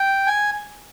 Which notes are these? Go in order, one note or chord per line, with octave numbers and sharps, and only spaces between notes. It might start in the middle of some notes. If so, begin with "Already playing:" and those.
Already playing: G5
G#5